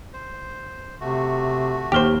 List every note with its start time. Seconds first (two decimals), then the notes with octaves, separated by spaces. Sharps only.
0.13 C5
1.00 C3 A3 F#4
1.92 D#2 G4 C5 F6 G7